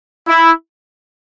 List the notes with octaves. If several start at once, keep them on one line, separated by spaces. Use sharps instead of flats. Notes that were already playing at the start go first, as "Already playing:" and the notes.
E4